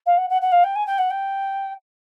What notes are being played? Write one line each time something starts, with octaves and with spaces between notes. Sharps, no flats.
F5
F#5
F#5
F#5
F5
G5
G#5
G5
F#5
G5